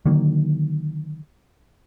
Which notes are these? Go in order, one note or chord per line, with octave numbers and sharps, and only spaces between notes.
D3 D#3 F#3 A#3